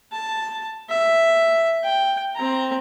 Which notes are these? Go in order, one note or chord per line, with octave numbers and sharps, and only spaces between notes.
A5
E5
G5
C4 A#5